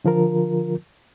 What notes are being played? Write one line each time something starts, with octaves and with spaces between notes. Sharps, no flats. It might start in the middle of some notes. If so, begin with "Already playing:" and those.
D3 F3 F4 A#4